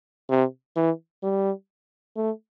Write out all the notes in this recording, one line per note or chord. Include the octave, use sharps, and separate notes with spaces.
C3
E3
G3
A3